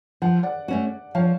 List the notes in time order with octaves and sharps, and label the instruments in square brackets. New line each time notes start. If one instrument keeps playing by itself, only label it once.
[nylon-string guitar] F3 [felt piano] F#5
[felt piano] D5 F#5
[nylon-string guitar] A3 C#4 F#4
[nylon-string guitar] F3 [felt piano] C#5 F5